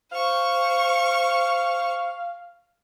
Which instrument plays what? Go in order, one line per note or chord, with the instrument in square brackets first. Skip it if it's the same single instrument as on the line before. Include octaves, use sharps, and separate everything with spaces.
[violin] C5 C#6 [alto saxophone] F5